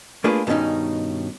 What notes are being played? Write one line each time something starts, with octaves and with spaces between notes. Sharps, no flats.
A3 A#3 D4 F4 G#4 B4
G2 B2 D#3 G3 C#4 D#4